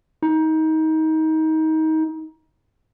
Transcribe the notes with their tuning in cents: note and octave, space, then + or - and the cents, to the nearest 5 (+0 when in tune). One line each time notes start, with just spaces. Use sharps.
D#4 +25